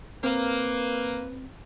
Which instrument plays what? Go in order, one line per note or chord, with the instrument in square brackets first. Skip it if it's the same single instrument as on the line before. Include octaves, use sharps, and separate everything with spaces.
[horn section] A#3 [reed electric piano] C4 [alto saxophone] B4